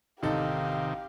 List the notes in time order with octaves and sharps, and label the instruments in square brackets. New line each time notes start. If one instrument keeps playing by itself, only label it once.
[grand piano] A1 A4 [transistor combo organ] C3 D#3 [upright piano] D#4 [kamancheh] G4 F5